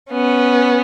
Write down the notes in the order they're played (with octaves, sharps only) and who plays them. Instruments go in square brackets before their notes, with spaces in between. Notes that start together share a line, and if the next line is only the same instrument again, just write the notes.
[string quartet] B3 C#4